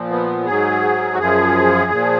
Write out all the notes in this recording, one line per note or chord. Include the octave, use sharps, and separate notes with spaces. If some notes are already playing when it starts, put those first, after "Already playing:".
Already playing: A#2 F3
B3
G#2 F#3 G#4
F#4
F#2 F3 G#4
A#2 F3